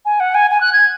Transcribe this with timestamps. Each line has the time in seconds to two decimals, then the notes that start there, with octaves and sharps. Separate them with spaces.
0.05 G#5
0.20 F#5
0.35 G#5
0.51 G#5
0.61 F#6
0.73 G#6